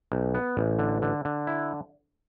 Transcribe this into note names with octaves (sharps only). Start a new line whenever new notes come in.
B1
B3
A1
D3
D3
D3
E4